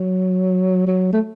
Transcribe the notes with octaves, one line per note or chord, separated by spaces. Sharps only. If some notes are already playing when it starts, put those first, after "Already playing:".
Already playing: F#3
F#3
A3